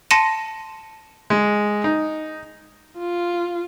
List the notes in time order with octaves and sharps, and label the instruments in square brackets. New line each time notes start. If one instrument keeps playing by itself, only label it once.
[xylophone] A5 C6 A#6 C#7 D#7 E7
[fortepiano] G#3
D#4
[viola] F4